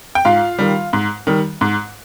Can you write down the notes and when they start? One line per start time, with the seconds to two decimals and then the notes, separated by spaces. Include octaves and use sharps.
0.15 G5
0.25 G#2 F4 F5
0.59 D#3 G3
0.93 G#2
1.27 D#3 G3
1.61 G#2